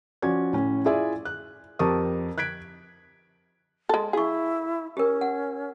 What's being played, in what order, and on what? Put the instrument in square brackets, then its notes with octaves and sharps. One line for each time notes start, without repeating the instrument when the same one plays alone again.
[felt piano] F3 C#4 F#4 D5 G#6
A2 C#4
E4 F4 G#4 D5 E5 G#5
F#6
F2 G4 A#4 A5 C#6 D#6
F#6 G#6 B6 D7
[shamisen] G#3 A4
[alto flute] E4 [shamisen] G#4 [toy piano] F5 C#6
[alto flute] C#4 [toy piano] G4 A#4
[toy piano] F#5